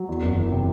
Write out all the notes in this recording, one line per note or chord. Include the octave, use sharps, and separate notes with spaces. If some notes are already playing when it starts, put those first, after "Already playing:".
Already playing: F#3
E2
F#1
E3
C3